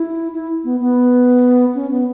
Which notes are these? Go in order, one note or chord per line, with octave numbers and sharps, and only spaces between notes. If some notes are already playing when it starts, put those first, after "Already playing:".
Already playing: E4
E4
B3
B3
C#4
B3